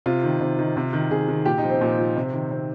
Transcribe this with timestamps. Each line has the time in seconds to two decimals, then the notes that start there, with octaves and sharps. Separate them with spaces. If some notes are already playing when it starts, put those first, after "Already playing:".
0.06 C3 F4
0.24 D#3
0.41 C3
0.59 D#3
0.77 C3
0.93 D#3
1.11 C3 G#4
1.28 D#3
1.45 A#2 G4
1.58 D#4
1.64 F3
1.70 C4
1.81 A#2
1.99 F3
2.16 C3
2.33 D#3
2.51 C3 C4